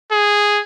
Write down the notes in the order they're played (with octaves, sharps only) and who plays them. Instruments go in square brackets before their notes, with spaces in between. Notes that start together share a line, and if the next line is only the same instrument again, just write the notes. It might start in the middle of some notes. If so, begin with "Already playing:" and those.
[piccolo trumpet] G#4